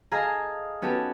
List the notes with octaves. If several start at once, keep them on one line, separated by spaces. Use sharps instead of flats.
G#4 A4 D#5 F5 G#5 A#5
B3 C#4 F#4 G4 A4